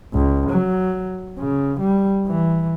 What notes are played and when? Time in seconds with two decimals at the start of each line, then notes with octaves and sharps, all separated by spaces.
0.14 C#2
0.50 F#3
1.39 C#3
1.80 G3
2.28 E3